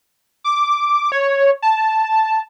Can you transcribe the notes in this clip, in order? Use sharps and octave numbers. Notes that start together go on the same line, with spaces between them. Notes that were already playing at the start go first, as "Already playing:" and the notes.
D6
C#5
A5